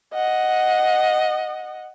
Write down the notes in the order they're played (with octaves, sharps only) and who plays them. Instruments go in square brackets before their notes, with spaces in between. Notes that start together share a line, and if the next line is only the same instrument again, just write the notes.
[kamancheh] D#5 F#5